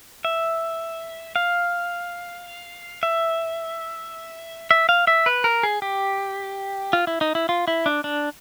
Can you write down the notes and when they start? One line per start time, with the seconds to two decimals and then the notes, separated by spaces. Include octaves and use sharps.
0.25 E5
1.36 F5
3.03 E5
4.71 E5
4.89 F5
5.07 E5
5.26 B4
5.44 A#4
5.63 G#4
5.82 G4
6.93 F4
7.07 E4
7.21 D#4
7.35 E4
7.49 F4
7.68 E4
7.86 D4
8.04 D4